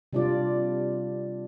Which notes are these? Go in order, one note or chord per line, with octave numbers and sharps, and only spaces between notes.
C3 G3 D4 F4 D5